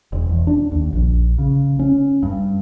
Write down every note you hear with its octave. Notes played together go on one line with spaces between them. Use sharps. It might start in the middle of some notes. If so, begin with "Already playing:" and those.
E1
E2
D4
D#2
A#1
C#3
C#4
G2